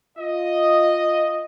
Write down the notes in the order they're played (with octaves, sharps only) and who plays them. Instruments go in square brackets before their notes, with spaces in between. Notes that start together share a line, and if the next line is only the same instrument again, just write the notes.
[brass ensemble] F4 D#5